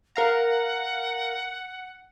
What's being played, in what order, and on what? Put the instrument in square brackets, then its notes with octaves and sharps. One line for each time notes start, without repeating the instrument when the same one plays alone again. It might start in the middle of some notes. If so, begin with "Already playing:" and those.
[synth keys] A#4 F5 A#5 [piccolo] F#5